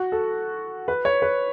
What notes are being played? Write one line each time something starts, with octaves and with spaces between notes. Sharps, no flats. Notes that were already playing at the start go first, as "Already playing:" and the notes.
Already playing: F#4
A4
B4
C#5
B4